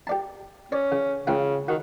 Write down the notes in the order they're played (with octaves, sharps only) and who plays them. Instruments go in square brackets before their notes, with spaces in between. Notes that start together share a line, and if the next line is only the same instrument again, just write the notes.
[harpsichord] G4 D5 A5
[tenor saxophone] C#4 [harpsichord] C#5 D5
[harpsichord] C#3
[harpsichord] C#2 F4 G5 [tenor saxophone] C#3
[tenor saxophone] D#3 [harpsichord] F#4